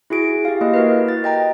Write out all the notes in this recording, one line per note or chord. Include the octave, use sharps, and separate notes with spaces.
E4 F#4 G#4 D7
G4 F5
A#3 E4 D#5
F#4 A#4 B4
A6
D#5 G5 A#5